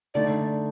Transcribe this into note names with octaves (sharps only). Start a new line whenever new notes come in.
D3 A3 D#4 D5